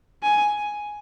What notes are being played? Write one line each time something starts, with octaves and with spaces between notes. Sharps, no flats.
G#5